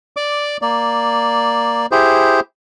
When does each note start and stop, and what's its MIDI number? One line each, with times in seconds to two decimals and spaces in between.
0.17 0.57 74
0.17 0.57 86
0.62 1.86 58
0.62 1.86 74
1.92 2.40 64
1.92 2.40 67
1.92 2.40 68
1.92 2.40 72